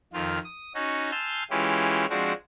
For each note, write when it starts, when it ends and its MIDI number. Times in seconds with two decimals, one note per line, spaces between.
0.13 0.39 41
0.13 0.39 51
0.13 0.39 65
0.44 0.72 87
0.75 1.11 61
0.75 1.11 63
0.75 1.11 66
1.11 1.43 80
1.11 1.43 81
1.11 1.43 84
1.11 1.43 88
1.11 1.43 89
1.11 1.43 91
1.50 2.06 52
1.50 2.06 56
1.50 2.06 61
1.50 2.06 64
1.50 2.06 65
1.50 2.06 67
2.10 2.33 53
2.10 2.33 56
2.10 2.33 60
2.10 2.33 62
2.10 2.33 66